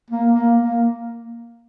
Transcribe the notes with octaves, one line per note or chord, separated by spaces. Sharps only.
A#3
A#3
A#3